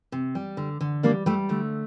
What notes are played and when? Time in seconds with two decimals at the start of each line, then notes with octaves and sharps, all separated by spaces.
0.12 C3
0.35 G3
0.57 D3
0.81 D3
1.03 G3 A#3 D4
1.26 G3 A3
1.49 D3 A3